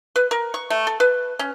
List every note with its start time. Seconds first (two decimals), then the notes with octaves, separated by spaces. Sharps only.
0.16 B4
0.31 A#4
0.54 C#6
0.70 A3
0.87 A4
1.00 B4
1.39 C#4